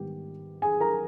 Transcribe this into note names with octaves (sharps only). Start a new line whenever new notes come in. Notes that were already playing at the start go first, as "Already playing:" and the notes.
Already playing: G#2 D#3 G3 B3 G4
G#4 G#5
A#4 A#5